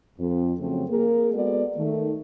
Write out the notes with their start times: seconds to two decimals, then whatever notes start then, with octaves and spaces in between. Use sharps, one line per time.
0.19 F2
0.59 C#3 F3 F#3 A3 C4
0.89 A#3 G#4 A#4
1.34 G#3 B3 F#4 G#4 A4 D5
1.77 D#3 A3